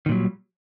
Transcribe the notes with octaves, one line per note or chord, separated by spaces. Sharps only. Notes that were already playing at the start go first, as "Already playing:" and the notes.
A#2 D#3 F#3 G3